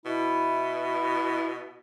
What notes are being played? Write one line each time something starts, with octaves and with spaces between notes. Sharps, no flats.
B2 E4